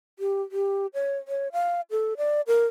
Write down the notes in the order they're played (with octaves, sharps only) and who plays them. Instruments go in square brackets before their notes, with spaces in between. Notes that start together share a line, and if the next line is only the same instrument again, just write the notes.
[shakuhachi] G4
G4
C#5
C#5
F5
A4
D5
A#4